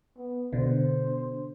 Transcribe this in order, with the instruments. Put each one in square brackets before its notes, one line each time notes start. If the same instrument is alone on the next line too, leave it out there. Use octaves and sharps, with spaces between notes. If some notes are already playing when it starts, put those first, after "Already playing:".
[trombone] B3
[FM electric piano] B2 D3 [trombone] C5